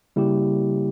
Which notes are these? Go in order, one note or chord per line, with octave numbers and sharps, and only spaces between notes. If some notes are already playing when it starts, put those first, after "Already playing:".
C#3 G3 A#3 E4 G4